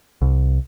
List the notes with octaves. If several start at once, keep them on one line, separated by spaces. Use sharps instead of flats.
C2